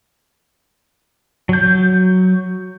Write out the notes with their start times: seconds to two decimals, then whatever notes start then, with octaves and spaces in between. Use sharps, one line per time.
1.49 F#3 G6